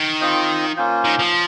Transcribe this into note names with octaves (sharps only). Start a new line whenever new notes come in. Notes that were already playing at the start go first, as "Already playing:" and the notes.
Already playing: D#3
C4 F4 C5 D#5
A#3 C#4 F4 C5
D#3
F3